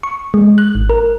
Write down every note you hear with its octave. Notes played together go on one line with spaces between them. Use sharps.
C#6
G#3
F#6
G#1
A#4